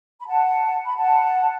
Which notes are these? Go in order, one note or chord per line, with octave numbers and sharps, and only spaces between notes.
B5
F#5 A5
B5
F#5 A5